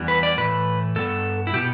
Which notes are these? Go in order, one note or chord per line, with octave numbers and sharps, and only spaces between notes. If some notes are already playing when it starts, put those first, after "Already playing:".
Already playing: E2 E3 G3 B3
B4
D5
A2 E3 A3 B4
G2 G3 B3 A4
E4
B2 B3 G4